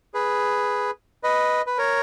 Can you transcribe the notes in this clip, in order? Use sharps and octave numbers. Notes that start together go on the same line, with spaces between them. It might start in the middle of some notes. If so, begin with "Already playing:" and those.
G#4 B4
B4 D#5
B4
A#4 C#5